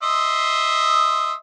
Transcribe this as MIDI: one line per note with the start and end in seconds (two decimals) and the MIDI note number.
0.03 1.33 75
0.03 1.33 76
0.03 1.33 84